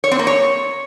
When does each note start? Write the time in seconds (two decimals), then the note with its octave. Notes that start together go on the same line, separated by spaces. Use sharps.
0.04 C#5
0.11 C4
0.19 A#3
0.27 C#5